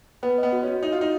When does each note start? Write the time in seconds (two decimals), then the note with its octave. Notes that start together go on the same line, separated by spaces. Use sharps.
0.23 B3 B4
0.38 B3 D#5
0.53 F#4
0.63 C#4 F#4
0.82 D#4 D#5
0.92 F4
0.98 D#4 F#4